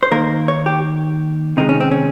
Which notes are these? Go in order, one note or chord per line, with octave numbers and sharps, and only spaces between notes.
C5
D#3 A#3 A#4
C#5
G4
C3 D#3 G#3 D#4
C#4
C4
C#4